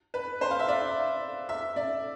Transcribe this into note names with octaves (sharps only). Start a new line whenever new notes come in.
B4
C5
F5
E5
D5
E5
D5